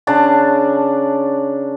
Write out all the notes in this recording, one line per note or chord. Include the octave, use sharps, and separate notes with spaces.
C#3 D4 A5 A#5